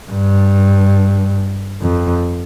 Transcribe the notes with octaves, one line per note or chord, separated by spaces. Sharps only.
G2
F2